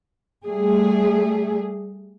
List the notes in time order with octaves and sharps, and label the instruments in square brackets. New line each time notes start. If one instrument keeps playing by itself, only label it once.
[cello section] G3 A3 G#4